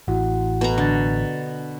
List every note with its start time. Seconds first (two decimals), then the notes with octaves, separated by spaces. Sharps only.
0.08 A1 E4 F#4 F#5
0.61 B2 A4 A#5
0.78 D3 D4 A6